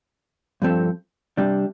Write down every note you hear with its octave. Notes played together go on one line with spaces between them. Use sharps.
G2 F3 C4 A4
C2 C3 G3 D4 G4